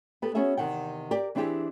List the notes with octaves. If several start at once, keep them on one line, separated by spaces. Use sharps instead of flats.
B3 G4 A4 B4
B3 C#4 F#4 G#4 E5
E2 C3 D#3 F#5 G5
G4 A#4 D5
E3 C4 D4 E4 G4 G#4